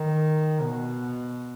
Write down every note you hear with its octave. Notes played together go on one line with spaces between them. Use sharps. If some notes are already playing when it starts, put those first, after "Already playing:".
Already playing: D#3
B2